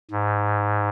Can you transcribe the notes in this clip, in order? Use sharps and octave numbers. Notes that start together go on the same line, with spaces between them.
G#2